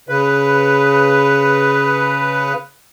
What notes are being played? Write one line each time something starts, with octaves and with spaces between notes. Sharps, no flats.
C#3 B4